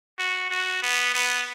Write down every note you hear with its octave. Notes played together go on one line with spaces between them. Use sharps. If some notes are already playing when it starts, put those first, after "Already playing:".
F#4
F#4
B3
B3